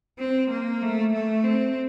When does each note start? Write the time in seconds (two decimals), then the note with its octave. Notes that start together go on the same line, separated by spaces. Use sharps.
0.19 C4
0.50 A#3
0.82 A3
1.13 A3
1.44 C4